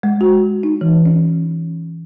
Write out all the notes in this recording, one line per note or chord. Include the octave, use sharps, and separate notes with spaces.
G#3
F#4
D#4
E3
C#4